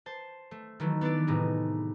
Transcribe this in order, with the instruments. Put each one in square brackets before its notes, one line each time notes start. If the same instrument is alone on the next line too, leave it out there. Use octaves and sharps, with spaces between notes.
[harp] C5 A5
A3
D#3 E3 F#3 A3
B3 D4 E4 D5
A2 C3 A3 D#4 G#4